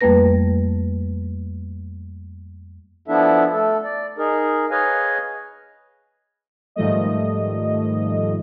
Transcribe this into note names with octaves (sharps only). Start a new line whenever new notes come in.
F2 G3 A3 A#3 B4 A#6
F3 B3 D4 E4 A4 E5
A3 A4
D5
D#4 G#4 A#4
G#4 B4 C#5 D#5 F5 G#5
G#2 D#3 F3 G3 A3 D#5